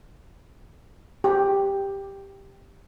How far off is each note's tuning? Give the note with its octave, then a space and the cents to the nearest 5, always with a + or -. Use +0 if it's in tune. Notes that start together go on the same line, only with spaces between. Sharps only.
G4 +5